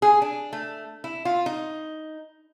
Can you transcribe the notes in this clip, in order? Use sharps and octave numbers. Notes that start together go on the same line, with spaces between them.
G#4
D4
A3
E4
F4
D#4